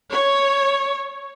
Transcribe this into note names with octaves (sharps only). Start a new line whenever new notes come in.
C#5